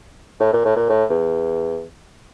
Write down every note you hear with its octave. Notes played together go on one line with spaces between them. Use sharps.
A2
A#2
A2
A#2
A2
E2